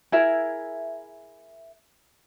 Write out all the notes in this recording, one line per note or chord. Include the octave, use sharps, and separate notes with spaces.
E4 G#4 A#4 E5